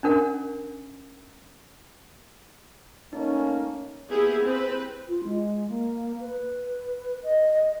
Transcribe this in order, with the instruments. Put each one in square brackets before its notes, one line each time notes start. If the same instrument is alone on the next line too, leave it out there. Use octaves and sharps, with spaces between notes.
[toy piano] C#4 D4 A#4 F#5
[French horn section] A3 A#3 C#4 [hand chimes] D#4
[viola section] A#3 B3 E4 G4 G#4
C4 B4
[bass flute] F4
G#3
A#3
B4
D#5